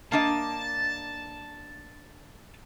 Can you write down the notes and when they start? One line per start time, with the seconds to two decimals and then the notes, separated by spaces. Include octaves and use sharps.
0.12 A#3 D4 D#5 A5